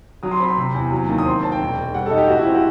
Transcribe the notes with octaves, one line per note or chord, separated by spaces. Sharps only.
F#3 D#6
C6
C4 B5
C6
C3 B5
E2
F#3
D#2
D#6
C4 C6
C4 A5
G5
E1
E1
G3 F#5
A4
D#4
G4
A1 F#4
E4
C4 G4
F#4